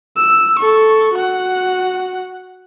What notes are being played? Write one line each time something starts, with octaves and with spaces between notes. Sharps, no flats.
E6
A4 C#6
F#4 F#5